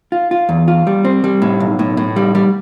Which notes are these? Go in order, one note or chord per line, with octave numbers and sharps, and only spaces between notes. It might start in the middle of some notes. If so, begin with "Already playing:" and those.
F4
F4
E2
F4
G3
C4
G3
A2
B1
A2
A2
G3
G3